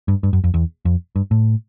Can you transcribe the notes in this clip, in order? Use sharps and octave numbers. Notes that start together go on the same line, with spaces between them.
G2
G2
F#2
F2
E2
F2
G2
A2